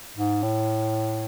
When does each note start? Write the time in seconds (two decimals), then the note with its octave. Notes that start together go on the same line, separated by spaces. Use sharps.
0.17 G#2
0.43 A2